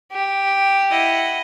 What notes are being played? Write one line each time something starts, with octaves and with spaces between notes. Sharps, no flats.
G4
E4 D#5 F#5